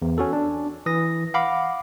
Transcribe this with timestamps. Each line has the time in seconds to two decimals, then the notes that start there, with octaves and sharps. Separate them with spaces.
0.02 E2
0.18 C#4 F#4 A4
0.33 D4
0.86 E3 D#6 A#6
1.34 F5 F#5 B5 D6